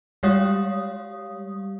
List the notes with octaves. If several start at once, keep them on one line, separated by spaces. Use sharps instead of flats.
G3 G#3 G4 C#5 F5 D#6